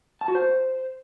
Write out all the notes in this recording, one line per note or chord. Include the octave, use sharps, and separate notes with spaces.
A5
F#4
C5